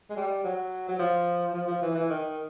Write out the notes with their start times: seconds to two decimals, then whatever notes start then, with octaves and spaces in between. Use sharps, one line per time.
0.10 G#3
0.16 G3
0.44 F#3
0.88 F#3
0.99 F3
1.54 F3
1.67 F3
1.82 E3
1.95 E3
2.09 D#3